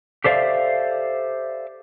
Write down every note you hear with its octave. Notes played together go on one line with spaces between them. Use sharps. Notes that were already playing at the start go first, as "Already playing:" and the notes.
G4 A4 C5 D5 E5 F5